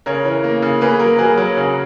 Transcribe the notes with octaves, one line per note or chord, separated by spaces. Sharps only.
C#3 A#4 C#5
E3
A#3
C#3
A#3 G#4 B4
F#3 A#4
F#3 G#4 B4
F#3 A#4 C#5
C#3